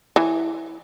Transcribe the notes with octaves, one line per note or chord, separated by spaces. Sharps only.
E3